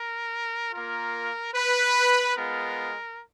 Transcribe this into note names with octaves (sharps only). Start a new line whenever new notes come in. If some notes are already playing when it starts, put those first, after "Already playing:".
Already playing: A#4
A#3 F4 A#4
B4
G#3 B3 F4 A#4